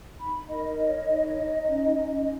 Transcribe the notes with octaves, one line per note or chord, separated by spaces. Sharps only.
D#4 B5
A#4 D#5
C#5
D#4
D#4
C#4
C#4